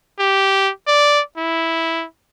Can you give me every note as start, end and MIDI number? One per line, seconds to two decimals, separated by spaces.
0.19 0.70 67
0.87 1.21 74
1.37 2.05 64